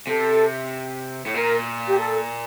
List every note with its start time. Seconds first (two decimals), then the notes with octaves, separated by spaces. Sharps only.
0.07 C3 A4
1.26 A2
1.34 A#2 A#4
1.88 G4
1.99 A4